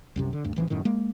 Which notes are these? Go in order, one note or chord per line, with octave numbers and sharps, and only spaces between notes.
C2 F#2 C3
D3
D2 G2
A1 E3 F3
D#1 F#2 A2 D#3
G#3 A#3